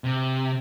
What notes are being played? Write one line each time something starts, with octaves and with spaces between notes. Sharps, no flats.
C3